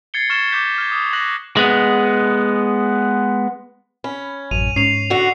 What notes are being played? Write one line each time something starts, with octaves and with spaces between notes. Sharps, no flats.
G#6 A6 C7 C#7 G7
C#6 F6 A6 E7 G7
D6 G6 B6
F6 G#6
D6 D#6
C#6 F#6 A#6 F#7
G#3 B3
C#4 B5
A1 F#2 D#7 F7
G#2 C#4 C7 F7
D3 F#4